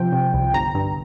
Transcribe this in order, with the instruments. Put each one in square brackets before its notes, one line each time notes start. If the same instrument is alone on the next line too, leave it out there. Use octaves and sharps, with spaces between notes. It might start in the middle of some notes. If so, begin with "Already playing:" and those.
Already playing: [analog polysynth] C3 F3 G5
C3
C2
G1 A#5
G2